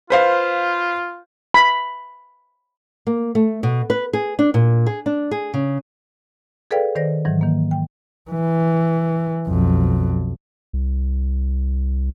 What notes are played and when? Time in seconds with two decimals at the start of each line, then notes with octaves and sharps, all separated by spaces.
0.10 F4 B4 C5 F5
1.54 B5
3.07 A#3
3.35 A3
3.63 B2
3.90 B4
4.13 G#4
4.39 D4
4.54 A#2
4.86 G#4
5.06 D4
5.31 G#4
5.54 C#3
6.71 G#4 A4 B4 D5 F5 G5
6.95 D#3 C5 D5 A#6
7.25 G#2 D#3 E3 F#3
7.41 D#3 A#3
7.71 G5
8.31 E3
9.47 B1 F2
10.73 C2